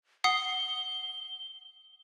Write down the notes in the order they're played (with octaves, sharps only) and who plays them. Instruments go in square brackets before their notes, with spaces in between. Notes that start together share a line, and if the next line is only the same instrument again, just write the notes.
[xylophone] F#5 D#6 C7 [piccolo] G7